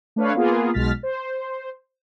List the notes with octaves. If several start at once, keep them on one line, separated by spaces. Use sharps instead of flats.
A3 D4 B4 C#5 F5
A#3 B3 F4 G#4
B1 B2 G#3 F6 A6 B6
C5